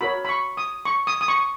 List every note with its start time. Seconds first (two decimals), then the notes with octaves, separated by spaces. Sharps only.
0.01 F#4 A#4 C#5 B5
0.25 B5
0.29 C#6
0.57 D#6
0.85 C#6
1.07 D#6
1.21 D#6
1.28 C#6